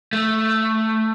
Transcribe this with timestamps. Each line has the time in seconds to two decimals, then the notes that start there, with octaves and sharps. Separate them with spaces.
0.13 A3